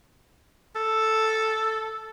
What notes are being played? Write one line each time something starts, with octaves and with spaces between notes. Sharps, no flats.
A4